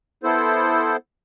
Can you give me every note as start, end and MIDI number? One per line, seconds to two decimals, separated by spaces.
0.24 0.96 59
0.24 0.96 64
0.24 0.96 69
0.24 0.96 72